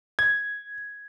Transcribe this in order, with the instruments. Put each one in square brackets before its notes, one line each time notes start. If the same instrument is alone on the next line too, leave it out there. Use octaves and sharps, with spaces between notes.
[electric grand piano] G#6